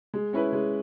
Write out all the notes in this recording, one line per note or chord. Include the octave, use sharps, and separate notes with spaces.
G#3
C#4 E4 B4
G#3